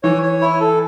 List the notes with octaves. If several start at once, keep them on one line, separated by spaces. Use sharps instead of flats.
E3 C#5
C#5
E4
A4